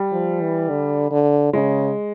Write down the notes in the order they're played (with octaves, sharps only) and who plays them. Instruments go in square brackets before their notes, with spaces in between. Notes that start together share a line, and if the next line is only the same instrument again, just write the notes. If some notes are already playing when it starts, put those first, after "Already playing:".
Already playing: [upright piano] G3
[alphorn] F3
E3
D3
D3
[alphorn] C#3 [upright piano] G#3